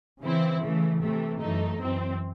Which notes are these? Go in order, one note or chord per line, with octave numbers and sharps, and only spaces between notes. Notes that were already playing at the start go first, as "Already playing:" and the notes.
C#3 E3 C4 E4
C#3 E3 A3
C3 E3 A3
F#2 E3 A3 D#4
F#2 E3 C4